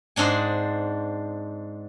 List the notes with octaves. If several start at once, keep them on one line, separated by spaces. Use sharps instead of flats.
G#2 C4 D4 G#5